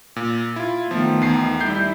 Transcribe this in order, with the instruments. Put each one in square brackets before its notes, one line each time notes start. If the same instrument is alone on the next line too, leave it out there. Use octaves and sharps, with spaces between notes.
[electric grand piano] A#2
E4 F4
[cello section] D#3 A3 B3 [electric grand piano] F3
[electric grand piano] E2 C7
[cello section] G3 E4 [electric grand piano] G6 C7